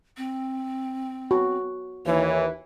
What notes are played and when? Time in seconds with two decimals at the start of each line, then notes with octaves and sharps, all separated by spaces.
0.17 C4
1.31 F#4
2.06 D#2 E3 C#5